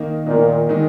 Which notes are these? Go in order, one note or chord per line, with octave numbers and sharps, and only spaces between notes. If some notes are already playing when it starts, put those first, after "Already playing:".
Already playing: D#3 A#3 D#4
A#2 D#3 A#3 D#4
D#3 G#3 D#4